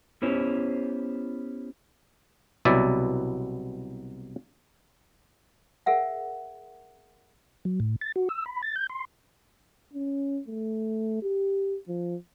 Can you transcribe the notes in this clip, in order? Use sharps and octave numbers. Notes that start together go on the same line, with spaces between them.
B3 C#4 E4 G4 C5 C#5
C2 B2 F#3 E4 D5 E5
G#4 A#4 E5 F#5
F#3
A2
A6
F#4
E6
B5
A6
G6
C6
C#4
A3
G4
F3